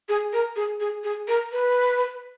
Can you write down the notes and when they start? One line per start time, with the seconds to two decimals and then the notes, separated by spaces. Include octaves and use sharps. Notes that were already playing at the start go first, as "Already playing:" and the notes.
0.09 G#4
0.33 A#4
0.56 G#4
0.80 G#4
1.04 G#4
1.28 A#4
1.52 B4